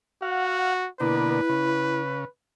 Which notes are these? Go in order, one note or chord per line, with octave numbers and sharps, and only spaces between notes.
F#4 F5 F#5
B2 D3 A#3 E4 B4
C#3